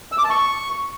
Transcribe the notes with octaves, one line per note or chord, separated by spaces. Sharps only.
E6
D6
A5
C#6